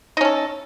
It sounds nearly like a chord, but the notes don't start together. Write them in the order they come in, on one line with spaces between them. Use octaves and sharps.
D#4 C#4 A4